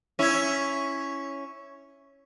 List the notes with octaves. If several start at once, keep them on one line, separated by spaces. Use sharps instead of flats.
C#4 E4